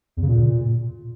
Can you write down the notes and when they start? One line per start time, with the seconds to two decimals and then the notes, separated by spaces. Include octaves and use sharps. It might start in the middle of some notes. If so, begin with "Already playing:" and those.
0.17 E2
0.22 C#3
0.28 A#2